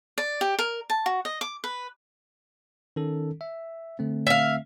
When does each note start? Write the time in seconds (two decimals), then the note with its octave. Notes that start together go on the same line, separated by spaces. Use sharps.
0.18 D5
0.41 G4
0.59 A#4
0.90 A5
1.06 F#4
1.25 D#5
1.41 D6
1.64 B4
2.96 D#3 C#4 A4
3.41 E5
3.99 D3 A3 C4
4.27 E5 F5